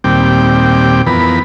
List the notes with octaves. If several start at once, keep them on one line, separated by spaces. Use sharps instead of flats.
D#2 A#2 G3 C4 G5 D6
F2 E3 B3 A#4 B5